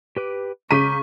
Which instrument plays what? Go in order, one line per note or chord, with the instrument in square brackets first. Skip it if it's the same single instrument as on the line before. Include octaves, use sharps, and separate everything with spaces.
[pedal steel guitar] G4 B4 D6
[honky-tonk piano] C#3 B6 D#7 [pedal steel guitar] A#5 D6 G6 [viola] C#6